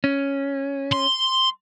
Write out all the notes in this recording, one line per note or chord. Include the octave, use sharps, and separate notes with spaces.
C#4
C6